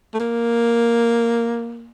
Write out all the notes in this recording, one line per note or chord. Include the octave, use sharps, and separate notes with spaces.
A3
A#3